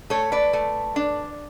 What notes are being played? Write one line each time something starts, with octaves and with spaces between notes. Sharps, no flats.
A3 A4 C#5
B4 D5
A3
D4